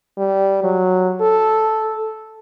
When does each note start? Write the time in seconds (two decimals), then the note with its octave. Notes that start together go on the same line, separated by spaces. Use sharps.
0.18 G3
0.64 F#3
1.21 A4